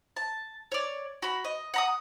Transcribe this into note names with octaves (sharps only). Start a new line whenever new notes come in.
A5
C#5 D5
F#4 B5
D#5
F#5 A#5 D#6